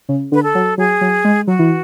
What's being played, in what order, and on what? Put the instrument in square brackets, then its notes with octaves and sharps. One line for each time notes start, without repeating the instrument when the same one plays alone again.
[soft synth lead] C#3
[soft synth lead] D3 [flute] B4
[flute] A4
[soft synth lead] F#3
[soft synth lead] F#3 [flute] G#4
[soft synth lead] F#3
G#3
[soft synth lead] F#3 [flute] F#4
[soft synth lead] E3